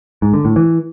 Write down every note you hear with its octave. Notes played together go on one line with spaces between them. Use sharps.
G#2
D3
A2
E3